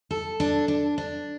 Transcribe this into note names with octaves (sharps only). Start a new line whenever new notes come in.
A4
D4
D4
D4